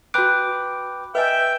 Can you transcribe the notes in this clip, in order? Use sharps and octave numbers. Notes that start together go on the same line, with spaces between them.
F#4 B4 G5 D6 F#6
B4 D#5 E5 G5 G#5